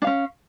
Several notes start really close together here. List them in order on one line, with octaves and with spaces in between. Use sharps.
D4 F5 C#4